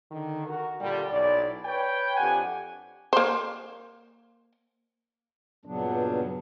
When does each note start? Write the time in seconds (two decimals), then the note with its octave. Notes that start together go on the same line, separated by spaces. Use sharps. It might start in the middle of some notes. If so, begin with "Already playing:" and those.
0.11 D3 D#3
0.47 F#4 A#4
0.81 A#2 D3 G3
1.09 B1 E4 D5
1.66 B4 C#5 G5
2.17 F2 D4 G4 F#5 G#5
3.13 A#3 C5
5.65 G2 A#2 C#3 F#3 B3 D4